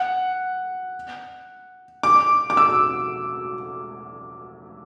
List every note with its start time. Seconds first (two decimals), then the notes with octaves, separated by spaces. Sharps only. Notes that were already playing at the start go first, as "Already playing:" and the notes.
Already playing: F#5
2.03 D6
2.50 D6
2.57 E6